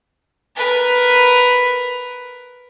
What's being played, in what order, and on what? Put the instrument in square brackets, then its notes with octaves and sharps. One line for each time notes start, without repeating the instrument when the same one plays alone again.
[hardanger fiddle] A#4 B4